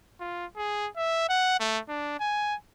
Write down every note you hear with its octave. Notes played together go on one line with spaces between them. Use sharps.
F4
G#4
E5
F#5
A3
D4
G#5